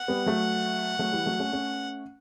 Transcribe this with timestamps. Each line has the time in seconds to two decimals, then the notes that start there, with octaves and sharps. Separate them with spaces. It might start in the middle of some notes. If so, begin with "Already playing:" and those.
Already playing: F#5
0.08 G3 B3
0.26 F#3 A3
0.99 F#3 A3
1.12 E3 G3
1.26 F#3 A3
1.40 A3 C#4
1.53 A3 C#4